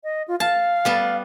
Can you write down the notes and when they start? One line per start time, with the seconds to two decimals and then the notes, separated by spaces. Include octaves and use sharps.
0.04 D#5
0.28 F4
0.40 F5 A5
0.85 G3 B3 A5